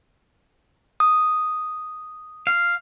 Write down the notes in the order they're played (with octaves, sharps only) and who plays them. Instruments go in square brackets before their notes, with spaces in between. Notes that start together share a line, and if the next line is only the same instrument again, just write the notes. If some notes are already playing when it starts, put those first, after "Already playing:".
[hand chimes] D#6
[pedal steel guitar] F5